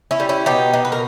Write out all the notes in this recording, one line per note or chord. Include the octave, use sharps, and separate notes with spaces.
C#4 E4
G3
C#4 E4
B2 D#4 G4
B2
B4
A#4